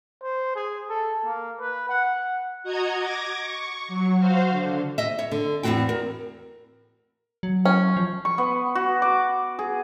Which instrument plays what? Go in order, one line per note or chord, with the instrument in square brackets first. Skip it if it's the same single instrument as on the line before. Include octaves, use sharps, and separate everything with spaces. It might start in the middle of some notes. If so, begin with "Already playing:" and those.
[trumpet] C5
G#4
A4
A#3
B4
F#5
[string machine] F#4 D#5 A#5 G#6
D6 G#6 A#6
C#6
F#3
F#4 C5 F5
D3
[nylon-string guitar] D#5 E5
C#5
D3
E2 A2 E3 C4 F#4 G5
A#4
[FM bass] F#3
[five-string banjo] C#4
[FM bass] F3
[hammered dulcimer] C#6
B3
F#4
D6
G#4